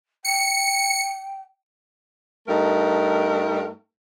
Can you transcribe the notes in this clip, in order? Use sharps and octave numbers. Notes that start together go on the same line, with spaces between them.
G5 C#7
G2 A3 D#4 A#4